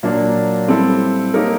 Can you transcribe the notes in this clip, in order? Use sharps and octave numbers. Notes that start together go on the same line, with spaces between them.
A#2 F#3 A#3 D4
G3 C4 E4 A4
A#3 D#4 G4 A#4 C#5